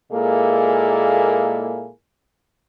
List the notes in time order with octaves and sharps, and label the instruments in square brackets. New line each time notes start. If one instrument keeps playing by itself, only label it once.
[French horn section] A#2 G#3 A#3 E4 G#4 A4